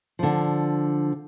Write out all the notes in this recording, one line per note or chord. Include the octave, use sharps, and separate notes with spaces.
D3 F3